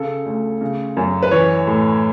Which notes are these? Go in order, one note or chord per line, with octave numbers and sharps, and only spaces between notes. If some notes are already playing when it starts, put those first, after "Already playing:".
Already playing: C#3 A4
D2
C#3
F#2
B4
E3 C#5
A2